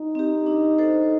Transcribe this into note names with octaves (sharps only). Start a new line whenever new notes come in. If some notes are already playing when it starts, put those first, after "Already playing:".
Already playing: D#4
C4 G4
D4
A4 C5